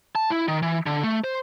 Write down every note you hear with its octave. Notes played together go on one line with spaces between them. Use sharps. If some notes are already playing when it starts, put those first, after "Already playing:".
A5
E4
D#3
E3
D3
A3
C5